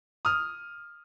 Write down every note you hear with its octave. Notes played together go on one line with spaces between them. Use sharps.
D#6 F6